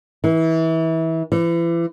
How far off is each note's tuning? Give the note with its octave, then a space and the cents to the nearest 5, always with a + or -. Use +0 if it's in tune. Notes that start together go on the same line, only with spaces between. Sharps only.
E3 -25
E3 +35